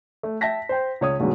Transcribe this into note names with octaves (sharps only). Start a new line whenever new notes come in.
A3
E5 G5 A5 A#6 B6
C5 G5
C#2 C#5 D#6
G2 B2 D#3 F#3 G#3